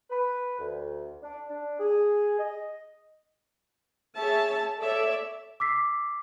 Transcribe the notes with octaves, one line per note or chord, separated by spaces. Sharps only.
B4
D2
D4
D4
G#4
D#5
G#4 C#5 E5 A5
A4 C#5 D5 E5
D6 E6 B6 C7